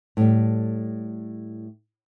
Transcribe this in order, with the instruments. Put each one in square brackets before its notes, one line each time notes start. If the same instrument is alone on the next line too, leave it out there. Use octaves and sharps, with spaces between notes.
[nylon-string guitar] A2 G3